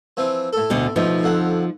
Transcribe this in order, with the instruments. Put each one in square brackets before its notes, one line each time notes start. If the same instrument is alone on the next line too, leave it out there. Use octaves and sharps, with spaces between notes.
[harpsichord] E3 F3 C4
A2 A4
[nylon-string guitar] D2 B2 D3
[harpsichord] A1 B2 E3 [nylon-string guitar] F3 D#4
[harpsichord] F2 D3 F#5